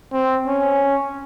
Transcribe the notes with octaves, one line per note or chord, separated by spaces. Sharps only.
C4
C#4